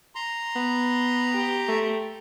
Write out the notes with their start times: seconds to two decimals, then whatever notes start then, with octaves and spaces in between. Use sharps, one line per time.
0.15 A#5 C6
0.56 B3
1.32 G4
1.68 A3